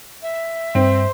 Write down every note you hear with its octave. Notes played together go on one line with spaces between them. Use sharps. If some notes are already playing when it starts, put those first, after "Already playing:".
E5
G2 C4 C5